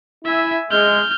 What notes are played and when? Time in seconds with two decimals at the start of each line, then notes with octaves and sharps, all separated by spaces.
0.25 E4 E5 G#5
0.71 G#3 F6 G6